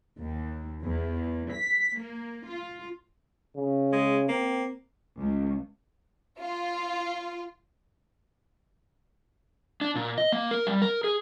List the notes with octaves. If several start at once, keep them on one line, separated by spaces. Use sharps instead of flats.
D#2
E2
B6
A#3
F4
C#3
G#3
A#3 C4
C#2
F4
D4
A#2
D#5
A#3
A#4
G3
A#4
G#4